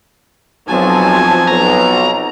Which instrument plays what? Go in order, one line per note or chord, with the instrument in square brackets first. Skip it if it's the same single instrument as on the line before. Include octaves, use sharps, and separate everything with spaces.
[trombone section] B1 [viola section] F3 F#3 A5 [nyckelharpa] C4 G#5
[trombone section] B1 [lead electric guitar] A#5